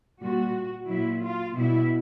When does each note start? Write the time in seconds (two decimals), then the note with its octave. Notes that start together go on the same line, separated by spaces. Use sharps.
0.19 A#2 G3 F#4
0.86 A#2 F#3 E4
1.21 F4
1.54 B2 G3 E4